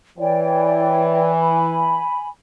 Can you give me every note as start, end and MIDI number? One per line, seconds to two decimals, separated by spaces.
0.19 2.03 52
0.19 1.30 73
0.19 1.30 74
0.19 1.30 79
1.41 2.28 80
1.41 2.28 83